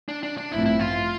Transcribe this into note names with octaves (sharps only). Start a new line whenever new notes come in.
D4
D4
D4
A1 G2 F3 A3 C4 E4
E4
F4